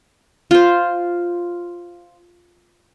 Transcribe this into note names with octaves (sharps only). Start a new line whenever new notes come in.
F4 C5